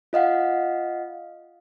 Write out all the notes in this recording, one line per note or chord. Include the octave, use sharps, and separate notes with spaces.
F4 D#5 F5 F#5